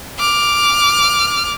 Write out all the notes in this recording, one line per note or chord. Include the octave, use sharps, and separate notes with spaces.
D6 F6